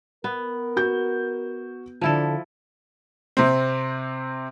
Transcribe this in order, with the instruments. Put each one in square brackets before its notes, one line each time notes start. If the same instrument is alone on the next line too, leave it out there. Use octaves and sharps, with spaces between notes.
[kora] B3 [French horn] A#4
[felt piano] F#4 G6
[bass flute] D3 [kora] F3 E4 A4
[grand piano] C3 C4